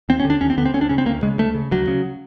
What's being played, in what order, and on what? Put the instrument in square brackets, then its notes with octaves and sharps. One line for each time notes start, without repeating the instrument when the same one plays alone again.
[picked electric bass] D#2 C4
C#4
D3
D4
D#2 C#4
C4
D3 B3
C4
D2 C#4
D4
C#3 C#4
C4
D2 A#3
C#3 G#3
D2 A3
C#3
D2 F#3
C#3